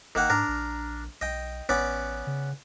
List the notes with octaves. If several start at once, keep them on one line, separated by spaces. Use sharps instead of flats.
G1 D#3 A#3 F#5
G#2 D4 A#4
A#1
B1 D#5 G5
A1 B3 C#4 D5
C#3